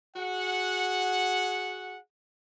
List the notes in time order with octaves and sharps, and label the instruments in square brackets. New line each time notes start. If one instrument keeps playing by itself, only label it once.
[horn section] F#4 G#4 F#5